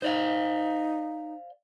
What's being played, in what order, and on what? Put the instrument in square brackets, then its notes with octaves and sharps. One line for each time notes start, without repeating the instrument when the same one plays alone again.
[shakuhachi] D#4 [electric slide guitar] C5 D5 F5